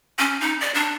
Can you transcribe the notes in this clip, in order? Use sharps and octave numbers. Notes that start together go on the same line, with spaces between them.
C#4
D#4
D5
D4